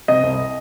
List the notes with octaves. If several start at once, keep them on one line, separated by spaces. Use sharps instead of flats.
C3 D#5
C2